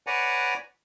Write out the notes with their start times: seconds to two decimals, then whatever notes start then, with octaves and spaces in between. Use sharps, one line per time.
0.07 B4 C#5 D5 F#5 G#5 A#5